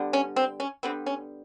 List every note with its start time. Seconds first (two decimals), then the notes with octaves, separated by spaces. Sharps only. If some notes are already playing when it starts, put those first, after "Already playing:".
Already playing: D3 G3 B3
0.13 C#4
0.36 C4
0.60 C#4
0.83 D3 G3 B3 C4
1.06 C#4